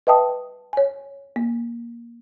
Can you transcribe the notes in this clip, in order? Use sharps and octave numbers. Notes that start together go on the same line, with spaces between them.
B4 D#5 E5 G5 A5 D#6
C#5 G#5
A#3